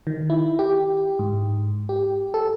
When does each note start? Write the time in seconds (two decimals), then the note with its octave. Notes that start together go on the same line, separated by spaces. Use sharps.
0.07 D#3
0.30 E4
0.59 G4
1.19 G#2
1.89 G4
2.34 A4